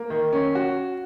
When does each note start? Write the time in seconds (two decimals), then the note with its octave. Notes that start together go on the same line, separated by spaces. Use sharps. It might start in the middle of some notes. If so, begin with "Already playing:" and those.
Already playing: A#3
0.10 D#3
0.33 C#4
0.55 F#4